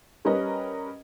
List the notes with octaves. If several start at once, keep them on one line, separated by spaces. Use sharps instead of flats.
G3 C#4 A#4 B4 D#5